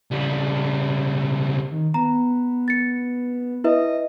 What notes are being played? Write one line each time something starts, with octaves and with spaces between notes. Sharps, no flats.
C#2 G3
D#3
B3 A#5
A6 C#7
E4 B4 D#5 E5